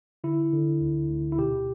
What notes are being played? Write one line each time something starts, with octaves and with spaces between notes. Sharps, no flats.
D3 E4
D3
D2
D2
E4
B2 G4